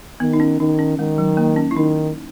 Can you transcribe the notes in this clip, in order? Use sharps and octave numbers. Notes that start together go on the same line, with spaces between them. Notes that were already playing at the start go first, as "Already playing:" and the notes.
D#3 B3
D#4
C#4
D#3 D#4
C#4
D#3 G#3
F#3
A#3
C#4
E4
D#3 D#4